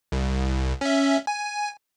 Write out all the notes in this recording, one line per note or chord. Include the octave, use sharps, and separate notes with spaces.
C2
C#4 E5
G#5